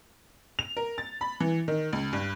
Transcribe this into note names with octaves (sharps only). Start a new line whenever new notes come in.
F7
A#4
A6
B5
E3
D#3
C#2
G2